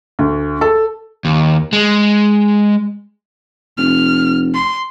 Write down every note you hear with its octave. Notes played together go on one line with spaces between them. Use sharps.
D2
A4
D#2
G#3
F1 F6
C6